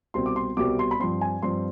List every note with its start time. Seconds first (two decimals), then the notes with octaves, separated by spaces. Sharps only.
0.14 C2 B2 G3 C4 C6
0.26 D6
0.36 C6
0.57 C2 B2 G3 C4 D6
0.79 C6
0.91 B5
1.00 G2 F3 C4 C6
1.21 G#5
1.42 G2 F3 C4 C6